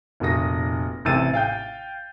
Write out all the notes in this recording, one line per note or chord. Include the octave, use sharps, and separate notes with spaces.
F1 A#2 F#4 D#6 A#6
A1 C3 C4 E6 A6 D#7
F5 G5 G6